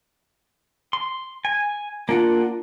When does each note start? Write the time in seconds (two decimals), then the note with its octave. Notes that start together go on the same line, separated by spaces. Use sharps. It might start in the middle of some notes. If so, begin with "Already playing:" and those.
0.93 C6
1.45 G#5
2.09 A#3 D4 F4 F#5